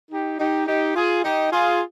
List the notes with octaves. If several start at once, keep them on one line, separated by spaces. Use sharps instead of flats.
D#4 G4
D#4 G4
D#4 G4
F4 G#4
D#4 G4
F4 G#4